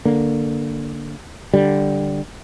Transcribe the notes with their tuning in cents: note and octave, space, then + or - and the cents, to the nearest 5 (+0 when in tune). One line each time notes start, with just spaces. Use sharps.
D3 +0 A#3 +0
D3 +0 G3 +0